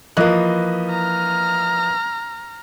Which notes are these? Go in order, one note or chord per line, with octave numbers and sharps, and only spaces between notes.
E3 F3 A#3 D#5 F#6
A#5 F6